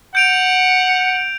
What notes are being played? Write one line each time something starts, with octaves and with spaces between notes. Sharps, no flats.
F#5 G6 D7 F7